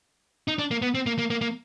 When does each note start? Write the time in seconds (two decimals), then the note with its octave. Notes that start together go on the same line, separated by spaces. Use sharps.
0.48 D#4
0.58 D4
0.71 A#3
0.82 B3
0.94 C4
1.06 A#3
1.18 A#3
1.30 A#3
1.41 A#3